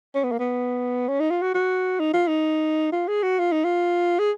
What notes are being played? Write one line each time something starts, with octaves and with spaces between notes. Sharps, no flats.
C#4
B3
A#3
B3
C#4
D#4
F4
F#4
F#4
D#4
F4
D#4
F4
G#4
F#4
F4
D#4
F4
G#4